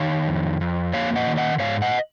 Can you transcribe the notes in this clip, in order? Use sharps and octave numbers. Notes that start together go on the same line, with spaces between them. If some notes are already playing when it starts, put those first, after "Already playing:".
Already playing: D#3 C#5 F5
F2
F2
A#3 C#5 F5
D#5 F#5
D#3
D#5 F#5
G#2 C#5 F5
D#5 F#5